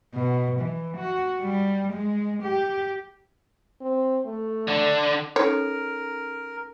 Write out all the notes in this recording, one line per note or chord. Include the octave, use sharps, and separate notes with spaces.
B2
E3
F#4
G3
G#3
G4
C4
A3
D3 D4
C#4 D#4 A4 A#4 C#5